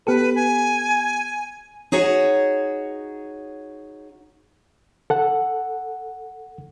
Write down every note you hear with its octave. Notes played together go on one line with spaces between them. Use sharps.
B3 G4 A4 B4
G#5
D#4 F#4 G#4 C#5 F#5
A4 F#5